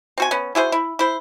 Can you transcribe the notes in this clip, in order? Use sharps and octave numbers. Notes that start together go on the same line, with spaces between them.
C4 F#4 G#5
B3 C#4
E4 F#4 G#4 C5
E4
E4 C5